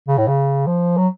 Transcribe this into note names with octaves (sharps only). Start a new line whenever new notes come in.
C#3
A2
C#3
F3
F#3